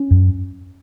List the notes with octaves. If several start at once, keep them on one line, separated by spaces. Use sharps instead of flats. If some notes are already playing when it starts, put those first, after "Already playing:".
Already playing: C#4
F#2